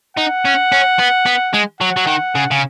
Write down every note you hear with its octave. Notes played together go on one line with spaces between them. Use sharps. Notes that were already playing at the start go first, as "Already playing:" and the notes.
D#4 F#5
C#4
C#4
B3
B3
G#3
F#3 F#5
F#3
D#3
C#3
C#3